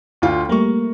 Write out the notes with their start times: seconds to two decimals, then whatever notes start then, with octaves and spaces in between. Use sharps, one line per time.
0.22 D2 F4 G5
0.49 G3 A3 A#3 A#4 C#6